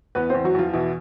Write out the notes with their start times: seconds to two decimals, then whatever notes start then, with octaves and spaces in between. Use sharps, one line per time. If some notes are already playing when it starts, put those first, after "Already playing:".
0.15 E2 B3 B4
0.30 E2 C4 C5
0.44 F#3 F#4
0.55 E2 F3 F4
0.73 B2 E3 E4